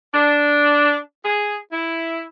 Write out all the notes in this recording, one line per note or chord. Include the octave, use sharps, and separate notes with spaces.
D4
G#4
E4